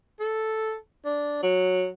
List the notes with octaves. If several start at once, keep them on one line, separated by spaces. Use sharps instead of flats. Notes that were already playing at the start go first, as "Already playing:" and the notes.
A4
D4
F#3